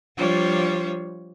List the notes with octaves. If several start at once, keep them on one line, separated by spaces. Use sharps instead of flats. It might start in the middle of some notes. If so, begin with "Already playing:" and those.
F3 G3 D4 F4 C5 C#5